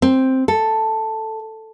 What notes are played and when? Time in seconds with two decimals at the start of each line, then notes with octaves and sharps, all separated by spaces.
0.02 C4
0.48 A4